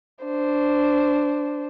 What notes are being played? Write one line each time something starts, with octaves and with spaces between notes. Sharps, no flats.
D4 C5